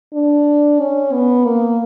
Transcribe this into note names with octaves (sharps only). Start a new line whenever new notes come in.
D4
C#4
B3
A#3